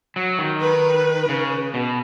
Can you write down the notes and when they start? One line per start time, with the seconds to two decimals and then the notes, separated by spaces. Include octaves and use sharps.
0.16 F#3
0.39 D#3
0.61 B4
1.29 C#3
1.74 B2